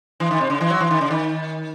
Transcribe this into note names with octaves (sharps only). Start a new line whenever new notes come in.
E3
D#3
C3
C#3
E3
F#3
E3
D#3
C#3
D#3